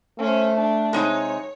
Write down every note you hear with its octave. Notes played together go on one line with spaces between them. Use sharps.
A3 C#4 C5
D4
C3 G#3 D#4 C#5